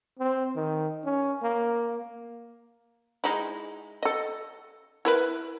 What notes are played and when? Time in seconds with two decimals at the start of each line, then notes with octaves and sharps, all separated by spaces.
0.19 C4
0.56 D#3
1.05 C#4
1.43 A#3
3.24 G#3 D#4 E4
4.03 A4 D#5
5.05 E4 A#4 B4